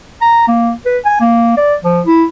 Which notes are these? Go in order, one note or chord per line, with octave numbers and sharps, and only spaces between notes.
A#5
A#3
B4
G#5
A#3
D5
F3
E4